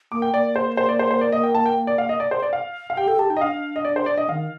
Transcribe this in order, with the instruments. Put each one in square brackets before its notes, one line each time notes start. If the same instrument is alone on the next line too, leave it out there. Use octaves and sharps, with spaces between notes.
[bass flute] A#3 [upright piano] D6
[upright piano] G5
[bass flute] A#3 [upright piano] D5
[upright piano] C5
C5
D5
C5
C5
D5
D#5
G5
A5
G5
D5
F5
D#5
D5
C5
D5
F5
F5
[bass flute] G4 [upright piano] G5
[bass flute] A4 [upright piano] G5
[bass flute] G4 [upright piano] A5
[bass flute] D#4 [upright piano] G5
[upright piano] D#5
[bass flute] D4 [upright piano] F5
[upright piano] D#5
D5
C5
D5
D#5
[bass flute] D#3 [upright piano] F5